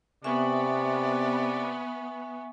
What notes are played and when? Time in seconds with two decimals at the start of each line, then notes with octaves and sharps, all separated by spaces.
0.24 C3 B3 D5 E5 G#5 C#6